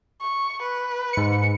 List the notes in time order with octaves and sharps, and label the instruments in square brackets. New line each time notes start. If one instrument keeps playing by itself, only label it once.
[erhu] C#6
B4
[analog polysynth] G#2 C#7